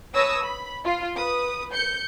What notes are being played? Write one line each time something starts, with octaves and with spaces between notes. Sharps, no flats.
B4 C#5 A5 D#6 E6 A#6
B5
F4
B4 D#6
G6 C#7